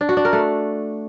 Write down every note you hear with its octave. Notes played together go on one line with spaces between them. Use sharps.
D4
F#4
D4
A#4
A3